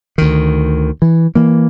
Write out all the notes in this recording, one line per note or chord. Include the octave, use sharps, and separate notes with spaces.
D2 D#3
E3
E3 A#3